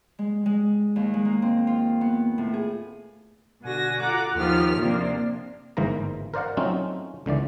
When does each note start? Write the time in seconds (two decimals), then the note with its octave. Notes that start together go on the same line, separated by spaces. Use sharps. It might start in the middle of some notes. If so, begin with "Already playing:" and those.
0.19 G#3
0.46 G#3
0.96 D#2
1.14 G#3
1.25 A#3
1.42 C4
1.67 F4
2.01 B3
2.38 A2
2.54 G#4
3.62 B2 D3 F#4 G#5 A#6
4.00 F4 A4 F#5 A#5 D6
4.35 D#2 D#3 F3 F4 G4 F6
4.79 C3 F3 A#3 C4 D4
5.77 G1 G#2 E3 A#3 C5 A#5
6.34 A#4 C5 D5 F5 F#5
6.57 F#3 A3 C4 C#4 D#4 F4
7.26 C#2 D3 E3 D5